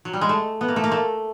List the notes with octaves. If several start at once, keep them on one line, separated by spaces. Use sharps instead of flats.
F#3
G3
G#3
A3
B3
A#3
A3
A#3
A3